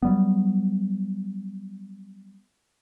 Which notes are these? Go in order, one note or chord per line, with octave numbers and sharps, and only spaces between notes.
F#3 G3 B3